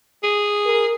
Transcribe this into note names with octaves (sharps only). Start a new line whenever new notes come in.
G#4
A#4